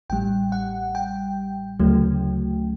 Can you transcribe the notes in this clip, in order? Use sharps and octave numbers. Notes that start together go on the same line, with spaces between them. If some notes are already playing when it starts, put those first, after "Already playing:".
A1 A2 G3 G5
F#5
G5
D2 C#3 F#3 A3